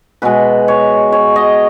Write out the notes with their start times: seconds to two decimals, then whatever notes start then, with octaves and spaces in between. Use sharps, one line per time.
0.22 B2 G#3 B4
0.68 C#5
1.12 C#5
1.36 D#5